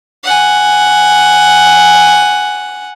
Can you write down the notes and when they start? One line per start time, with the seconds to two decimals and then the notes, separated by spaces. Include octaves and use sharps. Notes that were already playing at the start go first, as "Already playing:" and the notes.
0.24 F#5 G#5